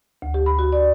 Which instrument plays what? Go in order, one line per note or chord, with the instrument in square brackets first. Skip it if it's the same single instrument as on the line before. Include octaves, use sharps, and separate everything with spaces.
[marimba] D2
G4
B5
F#4
D5